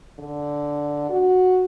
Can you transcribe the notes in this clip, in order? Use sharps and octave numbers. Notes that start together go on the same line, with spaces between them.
D3
F#4